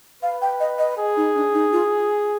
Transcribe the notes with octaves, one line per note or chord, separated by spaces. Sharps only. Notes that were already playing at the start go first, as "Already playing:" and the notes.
B4 F5
G5
D#5
D#5
G#4
D#4
D4
D#4
F4